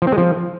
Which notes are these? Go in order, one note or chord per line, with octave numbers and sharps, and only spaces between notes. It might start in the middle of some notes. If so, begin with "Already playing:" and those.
F3
C4
G#3
F3